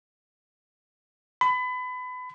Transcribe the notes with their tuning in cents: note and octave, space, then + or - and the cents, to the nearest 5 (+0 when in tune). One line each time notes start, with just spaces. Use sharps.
B5 +30